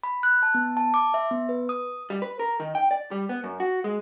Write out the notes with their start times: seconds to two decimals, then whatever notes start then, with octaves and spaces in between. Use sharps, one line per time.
0.03 B5
0.23 F#6
0.43 A5
0.54 B3
0.77 A5
0.94 D6
1.14 E5
1.31 B3
1.49 B4
1.69 D#6
2.10 G3
2.22 B4
2.39 A#4
2.60 D#3
2.75 G5
2.91 D5
3.11 G3
3.29 B3
3.44 F#2
3.60 F#4
3.84 G#3